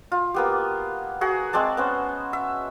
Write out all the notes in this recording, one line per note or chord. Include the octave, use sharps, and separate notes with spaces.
F4
A#3 B3 G4
F#4 G#4
G#3 C4 D5 A5
B3 C#4 C5
E5